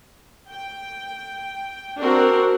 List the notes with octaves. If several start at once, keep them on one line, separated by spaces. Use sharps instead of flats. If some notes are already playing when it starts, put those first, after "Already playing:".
G5
C4 D4 F#4 A#4